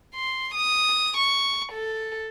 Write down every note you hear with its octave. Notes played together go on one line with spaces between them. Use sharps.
C6
D#6
C#6
A4